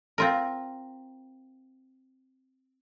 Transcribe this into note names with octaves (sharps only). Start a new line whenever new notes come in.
C4 F4 A#4